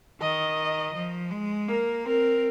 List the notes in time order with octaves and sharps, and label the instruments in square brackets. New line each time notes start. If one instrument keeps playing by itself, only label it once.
[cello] D#3 [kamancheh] D#5
[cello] F3
G#3
[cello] A#3 [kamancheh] A#4
[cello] C4 [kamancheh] A#4